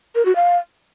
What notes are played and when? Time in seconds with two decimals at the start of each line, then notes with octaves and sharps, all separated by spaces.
0.15 A#4
0.26 F#4
0.36 F5